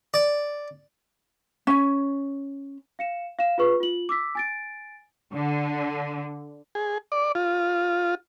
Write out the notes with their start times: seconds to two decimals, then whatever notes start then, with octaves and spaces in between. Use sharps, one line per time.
0.14 D5
1.67 C#4
2.99 F5 C#7 E7
3.39 F5 E7
3.58 F4 G#4 B4 C#6
3.80 F4 F#7
4.09 D6 E6 B6
4.35 G#5 A6 D7
5.33 D3
6.75 G#4
7.12 D5
7.35 F4